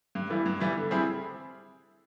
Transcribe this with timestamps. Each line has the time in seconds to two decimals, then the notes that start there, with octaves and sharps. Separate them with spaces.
0.15 G2
0.30 E3 G3 B3 E4
0.46 G2
0.60 E3 G3 B3 E4
0.77 D3
0.91 G3 C4 E4 G#4